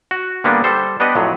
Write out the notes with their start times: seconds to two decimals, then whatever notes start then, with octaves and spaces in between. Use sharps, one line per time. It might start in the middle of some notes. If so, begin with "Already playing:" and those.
0.11 F#4
0.44 D3 G3 A#3 B3 D4
0.64 G3 A4 C5
1.00 B3 D4 G4 B4 D#5 F#5
1.15 F2 A2 F#3